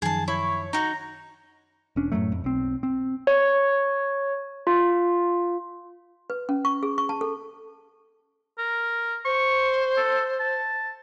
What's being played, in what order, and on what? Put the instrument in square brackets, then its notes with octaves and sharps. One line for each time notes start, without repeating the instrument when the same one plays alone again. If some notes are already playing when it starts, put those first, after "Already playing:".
[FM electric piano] F#2 D#3 F3 [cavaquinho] G#4 A5
[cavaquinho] E4 [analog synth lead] C#5
[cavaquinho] D#4 F#4 [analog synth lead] A#5
[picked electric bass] E1 C#4 D4
F#2 A2 F#3 A3
F2
B1 C4
C4
[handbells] C#5
F4
[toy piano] B4
C#4
C#6
G#4
C#6
A5
A4
[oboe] A#4
[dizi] C5 [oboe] C#6
[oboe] A4
A5